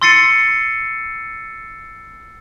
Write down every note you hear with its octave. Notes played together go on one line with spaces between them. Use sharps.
C6 E6 A6 C7 C#7 D#7